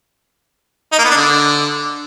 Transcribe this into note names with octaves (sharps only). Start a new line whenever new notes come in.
D#4
A#3
B3
D4
D3